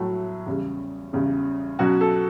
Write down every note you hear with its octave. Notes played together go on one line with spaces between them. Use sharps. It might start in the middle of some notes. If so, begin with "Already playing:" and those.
Already playing: A2 F#3 A3
E2 C#3 G3
E2 C#3 G3
B2 F#3 C#4 F#4
A4